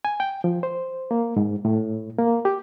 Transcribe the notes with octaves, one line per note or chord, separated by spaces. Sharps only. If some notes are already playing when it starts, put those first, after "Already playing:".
G#5
G5
F3
C5
A#3
G#2
A2
A#3
G4